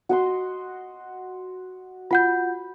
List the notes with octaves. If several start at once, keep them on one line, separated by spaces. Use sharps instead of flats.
F#4 D#5 C6
F4 F#5 B5 G6